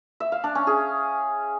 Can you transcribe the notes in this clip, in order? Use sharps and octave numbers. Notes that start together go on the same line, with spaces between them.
E5
F5
D4
C#4
G#4